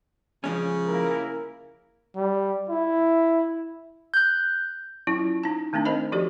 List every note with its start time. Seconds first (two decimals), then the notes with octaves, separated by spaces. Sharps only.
0.44 C#3 F3 G#3 C#4
0.87 A#3 E4 A#4
2.16 G3
2.70 E4
4.14 F#6 G6
5.07 F#3 C#4 E4 F4
5.43 D#4 A5
5.73 D#3 A3 C4 D4 D#4
5.85 A#4 C5 D#5 B5
6.12 F3 F#4 G4 A4 D5